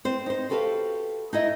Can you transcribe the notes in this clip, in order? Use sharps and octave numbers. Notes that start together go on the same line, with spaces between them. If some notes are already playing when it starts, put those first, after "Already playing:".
C4 C5
D#4 C5
F#4 G4 A4 B4 D5 F5
D#4 E4 D#5 E5